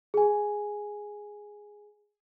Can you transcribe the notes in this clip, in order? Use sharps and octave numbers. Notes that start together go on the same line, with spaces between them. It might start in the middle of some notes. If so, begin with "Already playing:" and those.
G#4 G#5